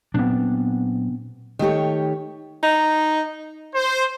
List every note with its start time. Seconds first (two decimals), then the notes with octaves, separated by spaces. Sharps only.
0.14 A#2 F#3 B3 C4 D4
1.59 D#3 A3 G4 C#5
2.63 D#4
3.75 C5